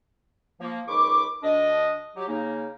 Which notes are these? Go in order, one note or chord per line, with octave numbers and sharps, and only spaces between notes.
F3 A#3
C#2 D#3 B5 C#6 D6
D2 D4 D#5
F#3 G4
C#3 A#3 D#4